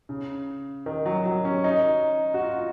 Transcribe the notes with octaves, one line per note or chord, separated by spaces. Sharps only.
C#3
D#3
F#3
F#3
C#4
D#4
F#4
F4